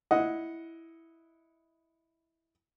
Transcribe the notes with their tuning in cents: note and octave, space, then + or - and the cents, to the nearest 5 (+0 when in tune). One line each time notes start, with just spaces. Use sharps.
E4 +0 D#5 +10 F#5 -5